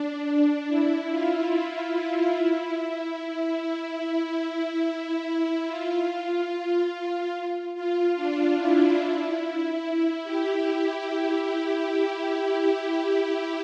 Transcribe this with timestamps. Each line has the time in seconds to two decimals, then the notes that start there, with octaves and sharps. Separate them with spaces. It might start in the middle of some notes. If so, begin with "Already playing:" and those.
Already playing: D4
0.68 E4
1.10 F4
2.35 E4
2.76 E4
3.17 E4
3.59 E4
5.67 F4
7.75 F4
8.16 D4
8.57 E4
10.24 G4